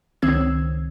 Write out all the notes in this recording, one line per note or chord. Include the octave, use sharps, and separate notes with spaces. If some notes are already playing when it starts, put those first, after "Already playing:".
C#2 D#3 C4 E6 G#6